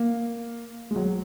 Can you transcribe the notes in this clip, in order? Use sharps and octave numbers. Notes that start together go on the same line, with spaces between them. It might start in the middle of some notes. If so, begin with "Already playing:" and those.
Already playing: A#3
G#3
F#3